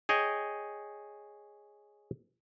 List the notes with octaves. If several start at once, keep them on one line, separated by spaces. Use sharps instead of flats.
G#4 C#5 D#5 G5